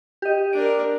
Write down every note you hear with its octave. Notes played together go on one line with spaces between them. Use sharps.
G4 D#5
D4 A#4 D7